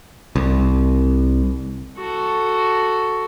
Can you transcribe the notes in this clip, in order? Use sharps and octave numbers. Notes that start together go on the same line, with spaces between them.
C2
F#4 A4